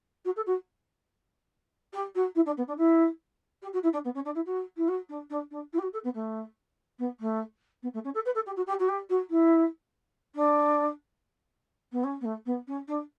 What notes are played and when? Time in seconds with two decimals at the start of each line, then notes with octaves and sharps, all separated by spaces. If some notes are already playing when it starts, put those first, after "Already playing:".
0.24 F#4
0.36 A4
0.46 F#4
1.93 G4
2.15 F#4
2.35 E4
2.45 D4
2.57 B3
2.67 D4
2.77 E4
3.62 G4
3.73 F#4
3.83 E4
3.93 D4
4.04 B3
4.14 C#4
4.25 D4
4.35 E4
4.45 F#4
4.76 E4
4.88 F#4
5.09 D4
5.30 D4
5.51 D4
5.73 E4
5.78 G4
5.82 F#4
5.93 A4
6.04 B3
6.14 A3
6.98 B3
7.20 A3
7.82 B3
7.93 A3
8.04 C#4
8.14 A4
8.25 B4
8.34 A4
8.46 G4
8.56 F#4
8.66 G4
8.79 F#4
8.88 G4
9.09 F#4
9.30 E4
10.35 D4
11.92 B3
12.04 C#4
12.21 B3
12.24 A3
12.45 B3
12.67 C#4
12.87 D4